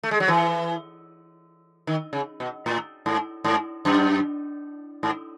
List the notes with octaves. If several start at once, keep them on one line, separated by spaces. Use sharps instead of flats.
A3
G#3
F#3
E3
D#3
C#3
B2
A2
G#2
G#2
F#2
G#2